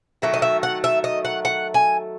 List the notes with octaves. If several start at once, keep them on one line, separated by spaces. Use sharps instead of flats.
D#3 F#3 A3 E5
D#5
E5
F#5
E5
D#5
F#5
F#5
G#5